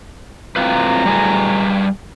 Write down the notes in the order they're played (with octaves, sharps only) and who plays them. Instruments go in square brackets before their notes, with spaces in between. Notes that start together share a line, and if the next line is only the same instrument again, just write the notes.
[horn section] A2 F#3 A#5 [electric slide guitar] C4 F4 B4
[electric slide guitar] G3 G#4 B4